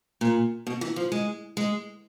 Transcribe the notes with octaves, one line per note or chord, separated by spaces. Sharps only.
A#2
B2
E3
F3
G#3
G#3